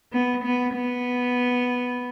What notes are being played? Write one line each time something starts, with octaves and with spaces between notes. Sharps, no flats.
B3
B3
B3